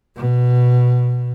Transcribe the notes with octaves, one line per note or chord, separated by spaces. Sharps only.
B2